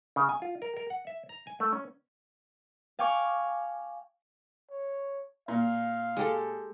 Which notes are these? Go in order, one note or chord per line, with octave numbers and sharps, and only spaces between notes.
C#3
G#5
F4
A#4
A#4
F#5
E5
A#5
G#5
A3
C#4
F5 G5 G#5 C#6 D6
C#5
A#2 F5
G#3 G4 A4